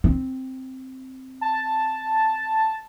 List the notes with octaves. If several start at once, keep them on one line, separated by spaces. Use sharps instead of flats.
C4
A5